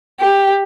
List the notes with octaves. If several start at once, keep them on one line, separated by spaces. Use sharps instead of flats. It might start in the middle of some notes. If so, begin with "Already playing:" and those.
G4